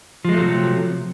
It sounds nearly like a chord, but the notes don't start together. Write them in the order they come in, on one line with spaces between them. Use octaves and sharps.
F3 G#3 A3 F#3 C3